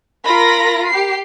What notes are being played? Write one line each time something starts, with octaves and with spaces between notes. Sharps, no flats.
F4 A#4 B5 A#6
G4 C7